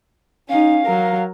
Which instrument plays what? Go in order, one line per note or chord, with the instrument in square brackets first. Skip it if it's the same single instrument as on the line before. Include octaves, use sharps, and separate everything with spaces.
[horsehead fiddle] C#4 D#4 [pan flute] F5
[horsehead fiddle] F#3 A#4